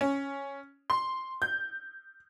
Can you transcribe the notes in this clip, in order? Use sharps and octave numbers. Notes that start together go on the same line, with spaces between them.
C#4
C6
G6